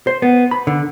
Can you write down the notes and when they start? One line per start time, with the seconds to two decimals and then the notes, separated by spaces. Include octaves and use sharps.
0.07 C5
0.22 B3
0.51 B5
0.67 D3